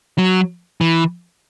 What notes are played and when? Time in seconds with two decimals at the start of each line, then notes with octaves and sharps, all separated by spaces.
0.18 F#3
0.81 E3